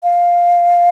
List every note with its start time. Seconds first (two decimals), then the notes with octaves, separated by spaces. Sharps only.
0.03 F5